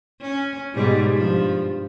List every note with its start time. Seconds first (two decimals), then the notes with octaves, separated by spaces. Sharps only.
0.21 C#4
0.74 G#2 B2 G3
1.15 G2 F3